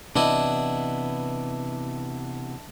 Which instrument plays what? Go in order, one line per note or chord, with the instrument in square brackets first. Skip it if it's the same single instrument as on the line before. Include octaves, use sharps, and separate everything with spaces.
[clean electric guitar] C3 E3 B3 [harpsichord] D4 E4 D#5